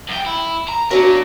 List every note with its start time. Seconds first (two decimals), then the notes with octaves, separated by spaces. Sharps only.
0.09 F#2 G5
0.26 E4
0.69 A#5
0.91 F#3 D4 A#4 D5